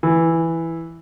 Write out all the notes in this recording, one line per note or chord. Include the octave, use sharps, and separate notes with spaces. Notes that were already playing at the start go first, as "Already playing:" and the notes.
E3